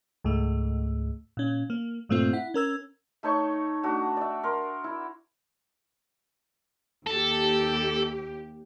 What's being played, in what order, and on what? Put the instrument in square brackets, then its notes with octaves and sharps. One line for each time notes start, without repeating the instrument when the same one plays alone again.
[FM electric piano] C#2 G#2 A3
A#2 C#4
A#3
G2 A#2 A3 A#3 C4 F4
E4 F#5
C#4 A#4 E6 G#6
[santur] A3 D#4 C#5 C#6
A3 D4 F#4
D5 E5
A#4 C6
E4
[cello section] D#2 G4 [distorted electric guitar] A4